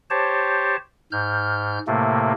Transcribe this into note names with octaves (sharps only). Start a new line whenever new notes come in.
G4 C5 C#5 A5
G#2 F6 G6
A2 C3 A3 A#3